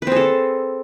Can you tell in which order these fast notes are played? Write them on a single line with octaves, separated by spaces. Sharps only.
B4 C4 G#4 A4